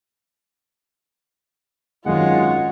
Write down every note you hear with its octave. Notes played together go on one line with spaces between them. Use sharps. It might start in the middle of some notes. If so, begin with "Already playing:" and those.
G#1 F#2 D#3 G#3 F4 C#5 F#5